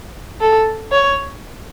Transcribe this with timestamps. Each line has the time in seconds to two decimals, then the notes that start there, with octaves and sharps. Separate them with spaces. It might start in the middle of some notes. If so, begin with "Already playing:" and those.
0.41 A4
0.92 C#5